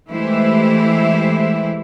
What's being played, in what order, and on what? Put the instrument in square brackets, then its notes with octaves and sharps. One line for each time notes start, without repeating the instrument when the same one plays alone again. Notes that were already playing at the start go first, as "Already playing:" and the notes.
[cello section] E3 G#3 A3 E4 G4 C5